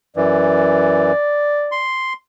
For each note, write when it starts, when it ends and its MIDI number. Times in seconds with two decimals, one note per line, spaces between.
0.17 1.12 42
0.17 1.12 52
0.17 1.83 74
1.72 2.13 84